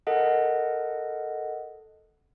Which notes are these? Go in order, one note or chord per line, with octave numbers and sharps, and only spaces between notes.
A4 A#4 D#5 F#5